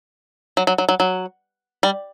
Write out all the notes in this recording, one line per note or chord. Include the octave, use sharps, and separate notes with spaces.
F#3
F#3
F#3
F#3
F#3
G3